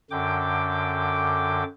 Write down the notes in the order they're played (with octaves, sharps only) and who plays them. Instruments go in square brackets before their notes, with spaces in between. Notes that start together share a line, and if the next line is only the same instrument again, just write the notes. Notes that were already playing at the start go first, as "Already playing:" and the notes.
[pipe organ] F#2 D3 G5 D6